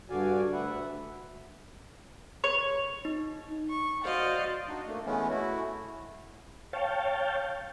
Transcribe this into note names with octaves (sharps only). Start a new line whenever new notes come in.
G2 D3 F#4 D5 F5 G#5
D2 B4 E5 F#5
C#5
D#4
C#6
F#4 C5 D5 D#5 F5 F#5
D4 D#4 F#4
A3 A#3
E3 G#3 A3 B3 C#4
A3 E4 F#4
C#5 F5 G5 A5